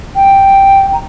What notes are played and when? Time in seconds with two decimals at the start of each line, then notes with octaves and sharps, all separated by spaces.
0.16 G5
0.94 A#5